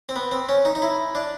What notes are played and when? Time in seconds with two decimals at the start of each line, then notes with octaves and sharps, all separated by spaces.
0.09 C4
0.16 B3
0.31 C4
0.49 C#4
0.65 D#4
0.75 D#4
0.82 E4
1.15 D4